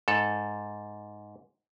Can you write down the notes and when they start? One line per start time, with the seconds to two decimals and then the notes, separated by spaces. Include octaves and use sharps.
0.08 G#2 A4